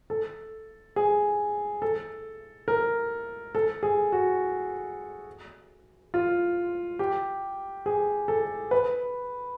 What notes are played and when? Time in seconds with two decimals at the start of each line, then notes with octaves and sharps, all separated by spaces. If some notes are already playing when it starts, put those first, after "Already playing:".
0.10 A4
0.96 G#4
1.82 A4
2.68 A#4
3.55 A4
3.83 G#4
4.12 F#4
6.14 F4
6.99 G4
7.86 G#4
8.28 A4
8.71 B4